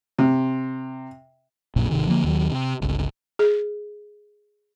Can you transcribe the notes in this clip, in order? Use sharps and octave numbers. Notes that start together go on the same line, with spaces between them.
C3
A#1 F#2 A#2
G#1 D2 C3 D#3
D3 F3 G#3 A#3
D#2 D#3 F#3
C3
G1 C#2
G#4